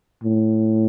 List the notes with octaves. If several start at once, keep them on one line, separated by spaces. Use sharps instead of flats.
A2